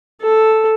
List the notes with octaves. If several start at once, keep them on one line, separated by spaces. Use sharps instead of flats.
A4